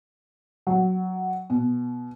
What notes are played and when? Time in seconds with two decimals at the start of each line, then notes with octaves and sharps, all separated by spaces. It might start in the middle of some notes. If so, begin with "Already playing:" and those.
0.67 F#3
1.50 B2